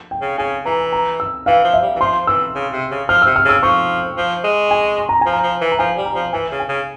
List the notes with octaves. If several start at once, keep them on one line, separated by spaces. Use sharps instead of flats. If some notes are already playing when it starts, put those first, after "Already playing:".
G5
C#3
C#3 G#5
E3 A#5
A#5
E6
E3 F5
F3
E5
G3
E3
F3 C6
E3 E6
C#3
C3
C#3
F3 F6
C3 E6
F6
C#3 E6
F3 C#6
F3
G#3
G#5
C6
A#5
F3 G#5
A#5
F3
E3
A#5
F3 G#5
G3
A#5
F3
E3 G#5
C#3
G#5
C#3